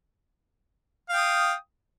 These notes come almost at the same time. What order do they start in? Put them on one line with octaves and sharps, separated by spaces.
F5 G5 D#6